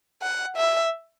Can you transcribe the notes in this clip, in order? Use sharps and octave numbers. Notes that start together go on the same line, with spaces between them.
F#5
E5